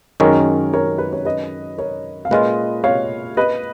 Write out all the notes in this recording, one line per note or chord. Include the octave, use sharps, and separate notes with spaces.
F#2 D#3 G#3 C#4 A#4 C#5
A#4 C#5
B4
C#5
B4 D#5
A#4 C#5
F5
A#2 G#3 C#4 F4 B4 D#5
C#5 F5
B4 D#5